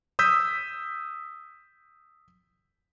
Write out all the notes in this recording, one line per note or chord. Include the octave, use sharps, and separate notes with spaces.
D#6 E6 G6 B6